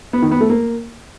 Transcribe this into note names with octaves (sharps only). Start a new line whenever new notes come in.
B3
D#3
B3
A3
A#3